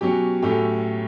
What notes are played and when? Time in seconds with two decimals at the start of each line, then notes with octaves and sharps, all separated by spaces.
0.01 B2 F#3 C#4 G4
0.42 A2 F#3 A3 C#4 G4